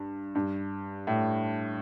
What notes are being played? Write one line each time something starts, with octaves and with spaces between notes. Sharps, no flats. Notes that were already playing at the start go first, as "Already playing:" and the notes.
Already playing: G2
G2
A2